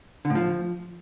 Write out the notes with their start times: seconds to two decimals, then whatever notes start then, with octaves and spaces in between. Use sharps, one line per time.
0.25 D3
0.30 A2
0.35 F3